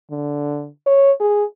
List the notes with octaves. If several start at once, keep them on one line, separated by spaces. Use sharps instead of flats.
D3
C#5
G#4